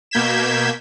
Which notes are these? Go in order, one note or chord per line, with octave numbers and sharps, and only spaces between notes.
B2 A#3 G6 G#6 B6 E7